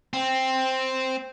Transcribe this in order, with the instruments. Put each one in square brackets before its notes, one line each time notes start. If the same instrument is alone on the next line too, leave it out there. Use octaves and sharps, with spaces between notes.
[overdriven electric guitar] C4